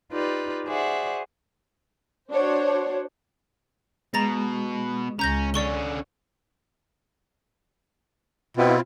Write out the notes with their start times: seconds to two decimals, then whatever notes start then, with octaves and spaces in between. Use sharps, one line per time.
0.12 D#4 F4 G4 B4 D5
0.65 F#4 G#4 C5 D5 E5 F#5
2.31 D4 F#4 C5 C#5
4.14 B2 G#3 A#5 A6 A#6
5.19 C#2 C#4 A#5 G6 A#6
5.54 D3 C#4 D5 C#6 G7
8.57 B2 C4 E4 F4